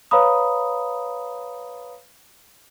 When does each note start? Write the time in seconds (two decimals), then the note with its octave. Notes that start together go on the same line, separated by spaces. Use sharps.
0.11 B4 C#5 F5 A#5 B5 D#6